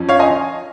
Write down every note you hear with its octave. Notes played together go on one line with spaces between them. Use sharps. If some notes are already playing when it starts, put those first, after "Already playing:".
Already playing: F2 F3 C#4
C#5 F5
D#5 G#5